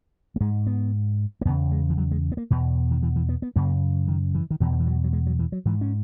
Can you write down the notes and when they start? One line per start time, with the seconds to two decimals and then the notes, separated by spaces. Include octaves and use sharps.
0.36 A#3
0.41 G#2 G#3
0.67 B3
1.41 A#3
1.45 E2 B3
1.49 C#3
1.72 G#3
1.90 E3
1.98 F#3
2.11 G#3
2.32 B3
2.37 A#3
2.51 E2 B2
2.91 D#3
3.03 E3
3.16 E3
3.29 B3
3.42 B3
3.56 F#2 C#3 A#3
4.08 D#3
4.35 E3
4.51 D#3
4.60 E2 B2 E3
4.72 D#3
4.80 E3
4.87 F#3
5.04 F#3
5.13 G#3
5.27 F#3
5.39 E3
5.52 F#3
5.65 G#2 E3
5.81 C#4